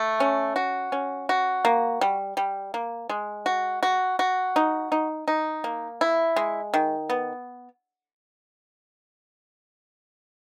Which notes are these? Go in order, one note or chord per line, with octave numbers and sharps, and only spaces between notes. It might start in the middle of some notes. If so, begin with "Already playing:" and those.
Already playing: A3
C#4
F#4
C#4
F#4
A#3
G3
G3
A#3
G#3
F#4
F#4
F#4
D#4
D#4
D#4
A#3
E4
G#3
D#3
B3